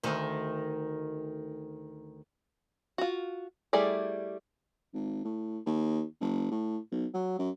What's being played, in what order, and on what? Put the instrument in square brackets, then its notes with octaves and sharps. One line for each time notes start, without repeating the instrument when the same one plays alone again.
[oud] D2 D#3
[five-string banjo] F4 F#4
G3 A3 E4 G#4 D5
[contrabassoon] G#1
A2
D#2
F#1
A2
B1
F#3
F#2